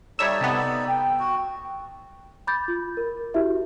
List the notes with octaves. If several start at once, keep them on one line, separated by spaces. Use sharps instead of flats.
G3 D#4 A4 C#5 D5 E5
C3 B3
G5
F#4
B5 D6 G6 A6
F4
A#4
E4 F#4 G4 E5